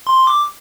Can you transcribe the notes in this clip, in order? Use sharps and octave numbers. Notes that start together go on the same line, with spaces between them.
C6
C6
D6